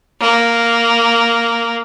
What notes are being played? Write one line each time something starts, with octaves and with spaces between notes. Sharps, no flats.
A#3